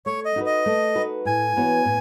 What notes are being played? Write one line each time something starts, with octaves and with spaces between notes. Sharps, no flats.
A3 C#5
D#5
D#4 F#4 B4
D#5
A3
D#4 F#4 B4
A2 G#5
E3 B3 F#4 C#5
A2